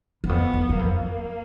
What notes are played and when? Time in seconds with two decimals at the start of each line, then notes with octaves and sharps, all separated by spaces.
0.24 E2
0.28 F2 B3
0.54 E2
0.69 F#2
0.79 F2 A#3